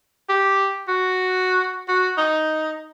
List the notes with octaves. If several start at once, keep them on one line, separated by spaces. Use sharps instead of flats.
G4
F#4
F#4
D#4